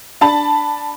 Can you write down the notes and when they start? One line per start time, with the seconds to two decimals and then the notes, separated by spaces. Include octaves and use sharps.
0.21 D4 A5 B5